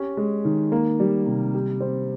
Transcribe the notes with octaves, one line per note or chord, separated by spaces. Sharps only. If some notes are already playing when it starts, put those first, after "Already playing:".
Already playing: C#4 G4
G#3
D#3
A#3
G3
C3
G4
C4